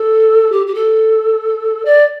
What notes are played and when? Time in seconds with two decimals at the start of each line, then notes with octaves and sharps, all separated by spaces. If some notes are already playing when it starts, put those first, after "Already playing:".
Already playing: A4
0.52 G4
0.67 G4
0.75 A4
1.85 D5